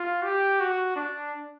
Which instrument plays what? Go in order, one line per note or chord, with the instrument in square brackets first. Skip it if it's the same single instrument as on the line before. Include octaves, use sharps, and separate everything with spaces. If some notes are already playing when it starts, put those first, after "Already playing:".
Already playing: [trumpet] F4
G4
F#4
D4